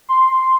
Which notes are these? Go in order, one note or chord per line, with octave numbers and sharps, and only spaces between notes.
C6